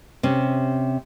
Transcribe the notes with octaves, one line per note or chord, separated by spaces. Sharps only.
C3 C#4